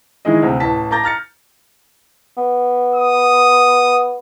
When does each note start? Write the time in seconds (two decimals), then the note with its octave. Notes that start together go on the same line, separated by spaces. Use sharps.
0.25 D#3 E3 G#3 E4 G#4 D#5
0.42 D2 C3
0.60 A1 E3 A5 B6
0.91 A5 A#5 D6 G6 A6 A#6
1.03 A#5 F6 A6 C#7
2.37 B3
2.95 D#6